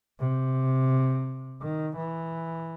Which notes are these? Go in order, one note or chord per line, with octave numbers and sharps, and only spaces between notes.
C3
D#3
E3